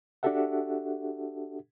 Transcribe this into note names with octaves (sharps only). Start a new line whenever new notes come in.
D4 F#4 G4 A4 E5 F#5